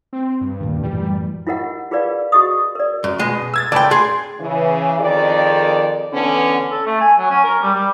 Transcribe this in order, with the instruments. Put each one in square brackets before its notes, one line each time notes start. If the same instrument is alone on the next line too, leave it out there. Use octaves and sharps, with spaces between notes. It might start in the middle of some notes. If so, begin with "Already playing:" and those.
[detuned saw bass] C4
G2
[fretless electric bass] D#2 A#2
[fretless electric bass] F#2 A2 E3 [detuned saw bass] G3
[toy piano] E4 F4 G4 A#4 D#5 F#5
F4 G#4 A#4 B4 D5 F5
F#4 G#4 D#5 C#6 D#6
A#4 D5
[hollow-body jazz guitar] F#2
B2 G#3 D#5
[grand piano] E6 G#6 A6
[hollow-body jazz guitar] C#2 G5 [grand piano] D5 A5 B5
[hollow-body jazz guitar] G#4 [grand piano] C6 G#6
[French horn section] C#3 E3
F2 D#3 G#4 D5
D3 E3 B3 C#4 D4
[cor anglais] A4
A3
G#5
F#3
C#4
A#4
G3
G3